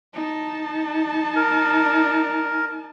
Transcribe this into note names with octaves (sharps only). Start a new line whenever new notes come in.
D#4 A5
A#4